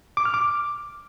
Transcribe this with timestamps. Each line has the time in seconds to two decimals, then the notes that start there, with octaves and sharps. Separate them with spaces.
0.17 D6
0.25 F6
0.34 D6